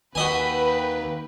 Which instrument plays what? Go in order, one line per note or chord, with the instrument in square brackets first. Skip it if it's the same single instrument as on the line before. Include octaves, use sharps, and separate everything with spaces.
[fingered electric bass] D#2 [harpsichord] F#4 D#5 G#5 [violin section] B4 G5 [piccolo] B5